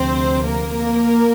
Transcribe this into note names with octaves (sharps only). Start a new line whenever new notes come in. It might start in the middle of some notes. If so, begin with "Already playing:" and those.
Already playing: D2 C3 F3 C4 C5
A#3 A#4